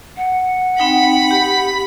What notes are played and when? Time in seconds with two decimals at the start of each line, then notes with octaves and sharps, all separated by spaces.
0.17 F#5
0.78 C4 D#4 G5 B5
1.31 G4